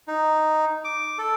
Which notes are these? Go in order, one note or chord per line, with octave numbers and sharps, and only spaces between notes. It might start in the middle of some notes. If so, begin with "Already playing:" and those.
D#4
D6
A4